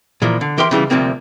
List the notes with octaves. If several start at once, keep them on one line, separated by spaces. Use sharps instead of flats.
A#2 E3 F3 A#3
D3
E3 G4 A#4 E5 C6
C#3 E3 G3 D4
D2 G#2 C3 F3 A#3 C4